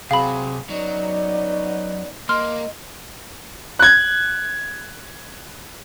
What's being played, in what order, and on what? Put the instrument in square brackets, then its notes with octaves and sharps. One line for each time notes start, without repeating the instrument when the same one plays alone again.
[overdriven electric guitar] C3 [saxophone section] F#3 C4 G#4 [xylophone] F5 B5
[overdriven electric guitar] F#3 [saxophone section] B3 C#4 D#4 [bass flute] D5
[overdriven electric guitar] A#3 [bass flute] D#5 [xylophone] C6 F6
[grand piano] F#6 G#6